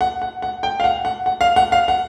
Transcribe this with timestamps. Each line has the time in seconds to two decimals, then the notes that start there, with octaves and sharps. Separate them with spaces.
0.01 F#5
0.22 F#5
0.42 F#5
0.63 G5
0.80 F5
0.84 F#5
1.05 F#5
1.26 F#5
1.41 F5
1.56 F#5
1.72 F5
1.88 F#5